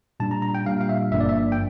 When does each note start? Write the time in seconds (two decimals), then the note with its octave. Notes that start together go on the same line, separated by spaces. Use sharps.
0.20 A#2 G3 D4 A5
0.31 A#5
0.42 A#5
0.55 G5
0.65 A#2 G3 D4 F5
0.81 F5
0.89 E5
1.11 G1 G2 F3 A#3 D4 E5
1.20 D5
1.29 E5
1.52 G5